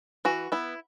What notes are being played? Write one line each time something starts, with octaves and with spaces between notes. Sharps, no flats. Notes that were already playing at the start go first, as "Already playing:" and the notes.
E3 F#4
B3 E4